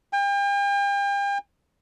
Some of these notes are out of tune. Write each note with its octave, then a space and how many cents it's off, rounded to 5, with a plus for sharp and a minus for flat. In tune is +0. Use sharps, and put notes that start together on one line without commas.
G5 +40